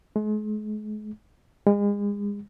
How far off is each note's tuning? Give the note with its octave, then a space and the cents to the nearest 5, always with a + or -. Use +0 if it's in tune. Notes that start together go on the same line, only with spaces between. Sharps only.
G#3 +40
G#3 -35